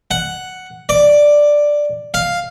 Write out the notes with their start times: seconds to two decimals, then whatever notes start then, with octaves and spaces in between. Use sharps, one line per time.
0.11 F#5
0.89 D5
2.14 F5